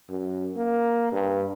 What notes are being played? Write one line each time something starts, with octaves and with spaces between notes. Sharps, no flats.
F#2
A#3
G2